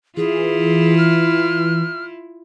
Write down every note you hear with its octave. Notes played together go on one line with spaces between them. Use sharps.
E3 E4 F4 G#4
F6